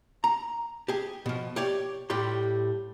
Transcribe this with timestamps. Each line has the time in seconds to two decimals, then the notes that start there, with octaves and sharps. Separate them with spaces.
0.24 A#5
0.88 G4 G#4
1.26 B2 F3
1.56 G4 C#5 D5
2.10 A2 G3 G4 C6